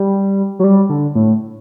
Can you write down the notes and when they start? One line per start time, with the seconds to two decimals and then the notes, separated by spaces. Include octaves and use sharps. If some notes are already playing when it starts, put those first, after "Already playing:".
Already playing: G3
0.59 F#3
0.64 G3
0.89 D3
1.15 A2